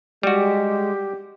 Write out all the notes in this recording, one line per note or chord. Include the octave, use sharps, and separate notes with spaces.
G3 G#3 F#4 G4